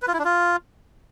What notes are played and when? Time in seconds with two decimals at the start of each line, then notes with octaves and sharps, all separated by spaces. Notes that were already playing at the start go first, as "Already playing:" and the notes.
0.02 B4
0.08 F4
0.14 E4
0.19 D4
0.25 F4